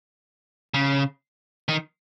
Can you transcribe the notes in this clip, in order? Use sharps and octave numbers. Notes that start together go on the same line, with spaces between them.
C#3
D#3